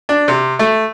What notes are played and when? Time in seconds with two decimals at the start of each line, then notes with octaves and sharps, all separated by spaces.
0.09 D4
0.28 C3
0.59 A3